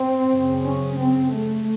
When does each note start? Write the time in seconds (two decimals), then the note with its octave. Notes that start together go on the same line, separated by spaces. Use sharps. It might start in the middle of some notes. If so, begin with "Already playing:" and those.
Already playing: C4
0.30 F#2 C#3
0.64 C#4
0.98 C4
1.32 A3